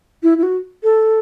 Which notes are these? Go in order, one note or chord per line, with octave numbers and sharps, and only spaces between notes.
E4
E4
F#4
A4